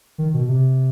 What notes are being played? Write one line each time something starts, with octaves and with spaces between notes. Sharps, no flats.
D#3
B2
C3